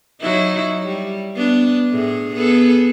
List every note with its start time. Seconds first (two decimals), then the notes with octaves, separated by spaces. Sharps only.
0.21 F#3 D#4 E4
0.83 G3
1.35 B3 D4
1.91 A2 G#4
2.34 B3 G#4 A4